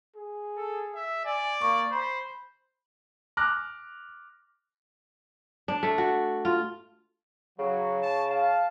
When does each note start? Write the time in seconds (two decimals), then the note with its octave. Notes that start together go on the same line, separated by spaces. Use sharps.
0.16 G#4
0.57 A4
0.95 E5
1.25 D5 G#5
1.62 A#3 C#6
1.92 C5 B5
3.37 D6 F6 F#6 A#6
5.68 D4
5.83 A3
5.98 F#4
6.45 F4
7.59 C#3 F#3
8.01 C#5 A5
8.32 F5 A5